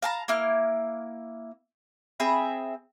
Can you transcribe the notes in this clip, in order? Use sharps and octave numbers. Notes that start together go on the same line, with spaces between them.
F5 A5 A#5
A#3 E4 F6
C4 G#4 E5 B5